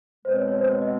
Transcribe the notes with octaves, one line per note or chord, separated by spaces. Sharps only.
B2 G#3 C4 C5
C#5
C#5
C5
C#5
D#5